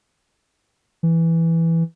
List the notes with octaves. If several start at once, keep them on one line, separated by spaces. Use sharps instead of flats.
E3